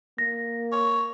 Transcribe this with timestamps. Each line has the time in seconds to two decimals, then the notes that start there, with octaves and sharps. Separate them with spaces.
0.18 A#3 A#6
0.72 C#5